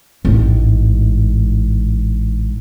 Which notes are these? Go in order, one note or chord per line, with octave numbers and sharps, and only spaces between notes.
A1 G#2